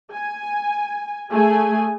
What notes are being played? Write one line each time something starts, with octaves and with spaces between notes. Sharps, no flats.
G#5
A3 G#4 G#5